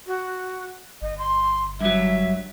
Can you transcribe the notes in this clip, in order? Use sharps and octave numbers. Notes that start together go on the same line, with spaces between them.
F#4
G1 D#5
C6
G2 F#3 E5